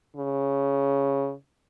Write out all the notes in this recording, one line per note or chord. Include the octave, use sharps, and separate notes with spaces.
C#3